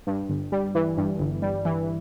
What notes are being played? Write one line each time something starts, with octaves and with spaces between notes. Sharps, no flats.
G2
G1
G3
E3
G2
G1
G3
E3